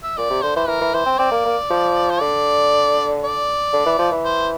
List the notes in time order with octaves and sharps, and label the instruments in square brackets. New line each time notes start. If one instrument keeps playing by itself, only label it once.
[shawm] E5
[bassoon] A#2 [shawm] D5
[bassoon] C3
[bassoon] D3 [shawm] C5
[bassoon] E3 [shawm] C5
[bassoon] E3 [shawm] A#4
[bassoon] E3
[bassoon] E3 [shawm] C5
[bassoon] C4
[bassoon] C4 [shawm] D5
[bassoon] A#3
A#3
F3
[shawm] C5
[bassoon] D3 [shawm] D5
[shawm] D5
[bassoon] D3
E3
F3
E3
[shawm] C5